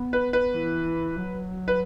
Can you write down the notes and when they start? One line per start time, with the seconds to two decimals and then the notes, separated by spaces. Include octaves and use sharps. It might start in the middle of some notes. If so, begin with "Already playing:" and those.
Already playing: B3
0.13 B4
0.33 B4
0.53 E3
1.16 F#3
1.68 B4